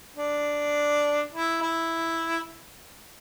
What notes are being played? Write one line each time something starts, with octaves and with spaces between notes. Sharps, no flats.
D4
E4
E4